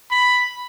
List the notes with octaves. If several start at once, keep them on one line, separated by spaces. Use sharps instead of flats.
B5